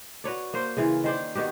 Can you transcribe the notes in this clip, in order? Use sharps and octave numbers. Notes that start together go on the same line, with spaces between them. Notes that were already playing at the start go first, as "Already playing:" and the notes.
F#4 B4 C#5 D5
A#3 A#4 C5
C#3 E3 F4
D#3 C5 D5
D#3 B3 F#4 G4